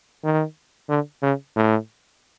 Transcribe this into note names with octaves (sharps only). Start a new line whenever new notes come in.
D#3
D3
C#3
A2